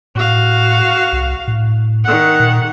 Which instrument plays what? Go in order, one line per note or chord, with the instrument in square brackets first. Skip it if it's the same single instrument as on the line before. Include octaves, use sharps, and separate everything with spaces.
[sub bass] A2 [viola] F#4 F5
[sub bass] C2
A2
[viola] D#3 F#5
[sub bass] A#2